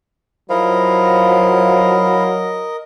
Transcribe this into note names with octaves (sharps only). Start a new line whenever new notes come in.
F3 F#3 E4 A#4 D#5 F5